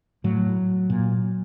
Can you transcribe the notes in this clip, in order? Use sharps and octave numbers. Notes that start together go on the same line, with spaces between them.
A2 F#3
A#2